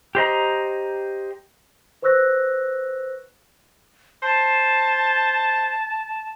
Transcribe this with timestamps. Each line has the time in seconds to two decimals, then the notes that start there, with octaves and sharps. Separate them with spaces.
0.15 G4 C5 D#5 A#5
2.02 B4 C5 C#6 E6 F#6 A#6
4.23 C5 A5